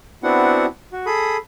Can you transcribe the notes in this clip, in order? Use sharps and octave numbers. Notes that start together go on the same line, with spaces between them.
B3 C4 D4 E4 F#4 F#5
F#4
G#4 A4 B5 D#6